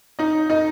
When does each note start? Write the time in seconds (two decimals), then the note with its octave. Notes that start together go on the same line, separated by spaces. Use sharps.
0.19 D#4 D#5
0.50 D#4 D#5